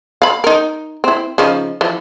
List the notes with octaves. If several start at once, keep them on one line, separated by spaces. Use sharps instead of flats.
F5 B5
D#4 A#4
C4 E4
C#3 F3 D#4
E3 F3